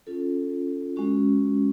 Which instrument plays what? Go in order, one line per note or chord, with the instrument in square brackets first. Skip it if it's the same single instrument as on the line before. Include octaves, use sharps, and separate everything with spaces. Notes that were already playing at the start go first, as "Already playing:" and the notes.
[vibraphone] C#4 F4 A4
G#3 C#4 F#4